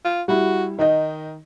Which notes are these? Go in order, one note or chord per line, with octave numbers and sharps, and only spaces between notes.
F4
G3 E4 F#4
D#3 D#4 D#5